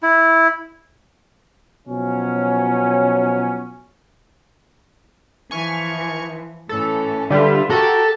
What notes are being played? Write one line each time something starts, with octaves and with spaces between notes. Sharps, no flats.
E4
B2 F3 F#3 C#4
E3 F3 G#5 C#6 F6
A2 E3 C#4 A4
D3 G3 F4 B4 E5
F#4 G4 A4 A#4 A5